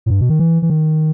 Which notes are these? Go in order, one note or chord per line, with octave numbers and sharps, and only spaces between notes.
A2
G2
B2
D#3
E3
E3
D#3